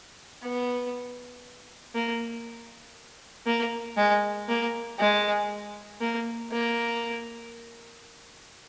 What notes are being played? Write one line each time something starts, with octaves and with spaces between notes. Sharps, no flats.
B3
A#3
A#3
G#3
A#3
G#3
A#3
A#3